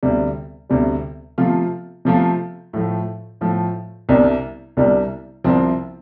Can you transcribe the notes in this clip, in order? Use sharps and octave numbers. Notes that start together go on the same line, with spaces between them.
D2 C3 G3
D2 C3 G3
C3 F3 A3 F4
C3 F3 A3 F4
A2 F3 A3
A2 F3 A3
C2 C3 G3 D4
C2 C3 G3 D4
C2 C3 F3 C4